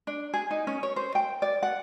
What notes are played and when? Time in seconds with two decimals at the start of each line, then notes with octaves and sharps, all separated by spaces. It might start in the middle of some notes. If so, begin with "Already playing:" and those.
0.07 D4
0.33 G#4
0.51 D#4
0.67 C#4
0.83 C#5
0.96 C5
1.15 G5
1.42 D5
1.63 F#5